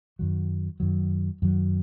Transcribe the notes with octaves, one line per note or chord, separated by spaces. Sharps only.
F#2 D#3 F#3
F#2 D#3 F#3
F#2 D#3 F#3